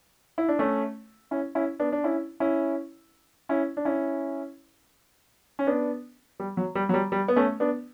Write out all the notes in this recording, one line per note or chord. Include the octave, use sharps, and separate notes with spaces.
E4
D4
A3 C#4
C#4 E4
C#4 E4
B3 D4
D4
C#4 E4
C#4 E4
C#4 E4
D4
C#4 E4
C#4
B3 D4
G3
F#3
G3
F#3
G3
G3
B3
A3 C#4
B3 D4